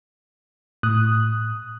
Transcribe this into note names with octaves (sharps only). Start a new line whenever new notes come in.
A2 D#6 F#6